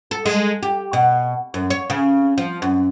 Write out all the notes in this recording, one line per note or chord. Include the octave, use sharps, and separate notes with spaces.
A4
G#3
G4
B2
F#2
C#5
C#3
F3
F#2